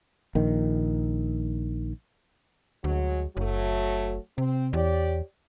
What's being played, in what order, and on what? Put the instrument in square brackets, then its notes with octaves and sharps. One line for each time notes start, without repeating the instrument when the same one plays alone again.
[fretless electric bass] A#1 D#3
[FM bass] D2 [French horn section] F#3 G#3
[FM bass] F#1 [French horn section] F#3 A3
[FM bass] C3 [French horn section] C4
[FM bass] E2 [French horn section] G4 C#5 D5